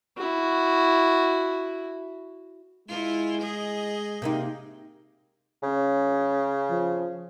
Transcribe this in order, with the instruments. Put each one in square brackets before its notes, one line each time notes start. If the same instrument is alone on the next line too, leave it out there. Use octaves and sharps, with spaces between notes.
[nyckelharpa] E4 F#4
[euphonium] G#3 [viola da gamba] E4 F4
[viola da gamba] G#4 D#5
[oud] C3 A#3 D#4
[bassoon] C#3 [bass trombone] C#4
[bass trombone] F3